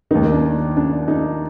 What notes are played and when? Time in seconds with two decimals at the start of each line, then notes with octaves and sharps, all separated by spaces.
0.11 D#2 D#3 D#4
0.32 D4
0.77 D4
1.08 D#4